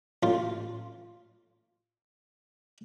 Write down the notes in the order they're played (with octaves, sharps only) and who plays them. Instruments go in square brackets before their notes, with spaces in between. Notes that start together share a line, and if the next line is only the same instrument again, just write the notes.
[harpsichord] A1 F4